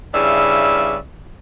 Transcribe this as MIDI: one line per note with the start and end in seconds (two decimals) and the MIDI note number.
0.14 0.96 43
0.14 0.96 49
0.14 0.96 64
0.14 0.96 74
0.14 0.96 76